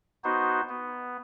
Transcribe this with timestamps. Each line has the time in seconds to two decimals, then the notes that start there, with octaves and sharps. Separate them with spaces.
0.24 B3 D#4 F#4 C5
0.69 B3